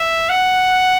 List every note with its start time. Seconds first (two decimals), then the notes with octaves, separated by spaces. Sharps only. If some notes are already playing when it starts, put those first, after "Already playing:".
Already playing: E5
0.29 F#5